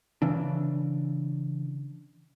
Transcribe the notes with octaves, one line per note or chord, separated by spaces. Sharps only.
C#3 E3 D4